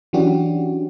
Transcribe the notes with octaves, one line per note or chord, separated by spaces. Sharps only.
E3 F#3 C#4 D4 F#4 G4